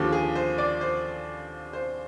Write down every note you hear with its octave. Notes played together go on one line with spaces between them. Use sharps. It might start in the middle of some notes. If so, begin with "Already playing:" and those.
Already playing: D#2 D3 F3 G4
G#4
C5
D5
C5
C5